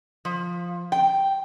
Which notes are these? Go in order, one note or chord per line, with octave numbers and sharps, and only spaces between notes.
F3
G5